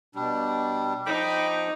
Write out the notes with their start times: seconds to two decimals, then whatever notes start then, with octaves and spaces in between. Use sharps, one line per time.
0.15 B2 G3 D4
1.06 F3 D#4 G5 B5 D6